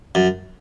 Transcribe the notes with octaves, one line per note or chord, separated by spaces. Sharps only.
F#2